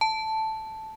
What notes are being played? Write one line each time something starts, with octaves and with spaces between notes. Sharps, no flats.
A5